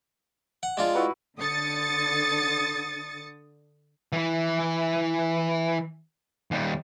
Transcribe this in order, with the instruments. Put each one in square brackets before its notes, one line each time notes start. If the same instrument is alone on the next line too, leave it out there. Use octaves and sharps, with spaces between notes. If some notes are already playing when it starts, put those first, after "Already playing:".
[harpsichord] F#5
G#3 D4 F4
[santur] E4 F#4 B4
[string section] D3 D#6 A6 C#7
[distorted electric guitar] E3 E4
D#2 G3